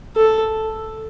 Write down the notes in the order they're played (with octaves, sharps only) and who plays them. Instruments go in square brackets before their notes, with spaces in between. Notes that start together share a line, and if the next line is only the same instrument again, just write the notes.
[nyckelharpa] A4